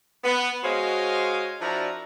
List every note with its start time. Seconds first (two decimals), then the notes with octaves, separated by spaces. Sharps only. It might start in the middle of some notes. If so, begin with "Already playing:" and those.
0.24 B3
0.64 G#3 F#4 C5 C#5 D#5 F5
1.60 F3 D4 E4 F#4 A#4 A#5